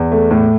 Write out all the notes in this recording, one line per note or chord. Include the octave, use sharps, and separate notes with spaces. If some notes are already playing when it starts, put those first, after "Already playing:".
Already playing: E2
A3
A2